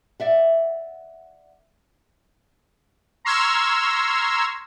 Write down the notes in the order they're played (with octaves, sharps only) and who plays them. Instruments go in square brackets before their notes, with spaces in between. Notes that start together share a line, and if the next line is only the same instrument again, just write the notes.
[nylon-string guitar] D5 E5 F#5
[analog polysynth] A#5 C6 C#6 E6 F6 G#6